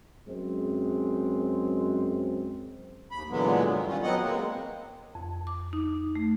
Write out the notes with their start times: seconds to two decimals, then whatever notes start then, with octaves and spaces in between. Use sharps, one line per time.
0.28 F#2 G#3 C4
3.11 D#2 B5
3.30 A#2 D3 E3 F#3 G#3 B3
3.71 G2 D#3
3.87 G3 C#4 F4
4.03 F#3 B3 C4 D#5 F#5
4.22 G#3 A#3 C4
5.15 F2
5.47 D6
5.73 D#4
6.15 A3